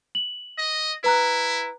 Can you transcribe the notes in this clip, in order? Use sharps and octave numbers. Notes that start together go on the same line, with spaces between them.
F#7
D#5
E4 B4 A#5 F#6